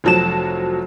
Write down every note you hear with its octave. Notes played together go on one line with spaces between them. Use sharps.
F1 F3 F#3 A5 E7